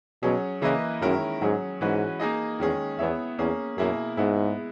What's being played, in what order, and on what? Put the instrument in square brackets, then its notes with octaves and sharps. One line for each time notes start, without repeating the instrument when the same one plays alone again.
[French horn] B2 [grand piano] F#3 C#4 G#4
[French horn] C#3 [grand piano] E3 A#3 E4 B4 D#5
[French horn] F#2 [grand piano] D#3 G#3 C#4 E4 A#4
[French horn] G#2 [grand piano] F#3 C#4 G#4
[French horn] G#2 [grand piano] E3 G#3 C#4 F#4 B4
[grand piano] A#3 D#4 G#4 D#5
[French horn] E2 [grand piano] D#3 G#3 C#4 G#4
[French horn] E2 [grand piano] B3 E4 G#4 C#5 E5
[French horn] E2 [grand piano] A#3 C#4 G#4
[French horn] F#2 [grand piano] B2 A#3 E4 G#4
[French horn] G#2 [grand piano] G#3 B3 E4